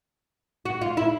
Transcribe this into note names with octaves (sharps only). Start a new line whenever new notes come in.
F#4
F4
E4